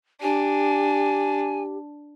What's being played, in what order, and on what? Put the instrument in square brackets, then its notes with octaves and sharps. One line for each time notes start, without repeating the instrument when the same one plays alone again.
[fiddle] D4 [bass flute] G4 [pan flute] G#5